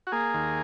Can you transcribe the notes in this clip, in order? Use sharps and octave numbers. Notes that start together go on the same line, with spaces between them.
F#4
A#3 G#4
D#2